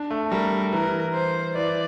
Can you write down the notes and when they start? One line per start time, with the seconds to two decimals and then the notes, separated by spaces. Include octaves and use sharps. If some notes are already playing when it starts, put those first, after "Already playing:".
Already playing: D4
0.10 A3
0.31 G3 A#4
0.73 E3 A#4
1.14 C5
1.55 E3 D5